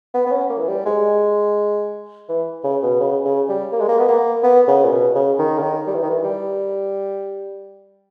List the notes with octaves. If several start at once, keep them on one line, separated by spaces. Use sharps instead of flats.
B3
B3
C#4
A#3
E3
G3
G#3
E3
C#3
B2
C#3
C#3
G3
A#3
G#3
A#3
B3
A#3
B3
C#3
A#2
B2
C#3
D#3
C#3
D#3
G3
E3
D#3
E3
G3